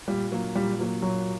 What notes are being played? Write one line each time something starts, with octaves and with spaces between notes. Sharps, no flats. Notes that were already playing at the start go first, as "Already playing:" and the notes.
A#2 G3
F#3 A#3
A#2 G3
F#3 A#3
A#2 F#3